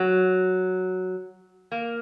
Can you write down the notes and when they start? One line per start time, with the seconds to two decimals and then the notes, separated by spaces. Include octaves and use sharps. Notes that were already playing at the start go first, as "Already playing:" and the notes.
Already playing: F#3
1.72 A#3